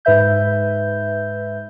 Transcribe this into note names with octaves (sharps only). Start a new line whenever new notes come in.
G#2 B4 E5 G6